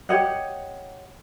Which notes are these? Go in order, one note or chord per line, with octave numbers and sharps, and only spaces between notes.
G4 C#5 D#5 F#5